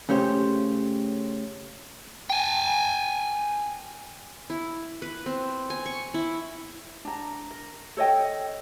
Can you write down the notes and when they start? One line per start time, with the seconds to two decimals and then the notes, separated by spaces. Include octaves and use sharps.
0.09 C#3 A3 C#4 G4 C5
2.30 G5 G#5
4.50 E4
5.02 B4
5.26 C4
5.70 G#5
5.86 C#6
6.14 E4
7.05 D4 A#5
7.51 A#4
7.97 A4 C#5 D#5 G5